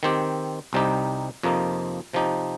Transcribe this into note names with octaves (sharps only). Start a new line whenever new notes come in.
D#3 C4 G4
C2 C3 G3 D#4 G4
F2 C3 F3 A#3 D#4
C3 F3 D#4 G4